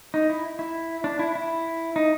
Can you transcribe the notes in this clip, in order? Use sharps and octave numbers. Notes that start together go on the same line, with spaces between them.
D#4
E4
E4
D4
E4
E4
D#4